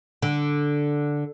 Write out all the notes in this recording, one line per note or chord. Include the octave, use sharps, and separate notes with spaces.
D3